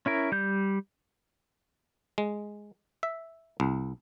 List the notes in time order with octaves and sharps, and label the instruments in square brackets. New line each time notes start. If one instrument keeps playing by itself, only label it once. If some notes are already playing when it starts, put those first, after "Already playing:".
[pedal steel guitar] C#4 E4 A#4
G3 G6
[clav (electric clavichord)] G#3
E5
C2